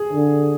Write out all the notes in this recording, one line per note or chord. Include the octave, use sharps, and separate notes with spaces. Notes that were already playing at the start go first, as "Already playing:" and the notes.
Already playing: G#4
D3